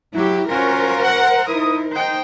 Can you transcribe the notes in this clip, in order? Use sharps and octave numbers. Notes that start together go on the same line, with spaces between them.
F#3 E4 G4
C#4 F4 F#4 A#4 C5
F#5
D#4 E4 D#6
D#4 C5 G5